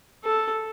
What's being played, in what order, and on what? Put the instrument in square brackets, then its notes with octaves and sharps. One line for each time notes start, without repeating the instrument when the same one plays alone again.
[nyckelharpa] A4